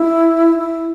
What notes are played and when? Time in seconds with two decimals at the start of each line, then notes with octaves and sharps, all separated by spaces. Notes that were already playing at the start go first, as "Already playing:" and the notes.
Already playing: E4
0.59 E4